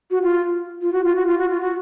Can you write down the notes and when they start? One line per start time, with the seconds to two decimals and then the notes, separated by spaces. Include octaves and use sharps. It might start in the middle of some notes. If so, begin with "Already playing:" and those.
0.11 F#4
0.22 F4
0.81 F4
0.93 F#4
1.04 F4
1.15 F#4
1.26 F4
1.38 F#4
1.49 F4
1.60 F#4